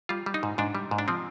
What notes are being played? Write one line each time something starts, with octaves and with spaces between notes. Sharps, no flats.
G3 F4
G3
D#4
G#2
G#2 D4
G3
G#2
D4
F3 C4